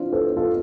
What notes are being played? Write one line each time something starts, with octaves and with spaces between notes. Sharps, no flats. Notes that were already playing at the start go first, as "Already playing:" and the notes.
Already playing: C4 D4 E4 F4
A4 C5
F4 A4